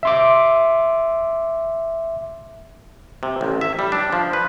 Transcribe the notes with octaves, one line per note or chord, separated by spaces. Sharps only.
E5 C6 D6
C3
A1
E5
G3
D4
F3
B4